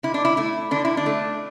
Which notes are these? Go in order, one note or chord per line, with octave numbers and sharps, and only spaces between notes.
D3 E4
D4
E4
A3 E4
D3 D4
E4
D4
A3